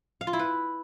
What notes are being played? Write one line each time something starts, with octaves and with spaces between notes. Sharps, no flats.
F5
F4
E4
B4